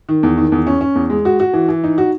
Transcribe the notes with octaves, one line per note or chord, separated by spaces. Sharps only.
D#3
E2
D#3
E2
C#4
C#4
E2
G#3
F#4
F#4
E3
E3
D#4
F#4